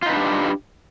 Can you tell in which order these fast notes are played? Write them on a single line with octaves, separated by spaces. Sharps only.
F4 D#4 B4 D4 G4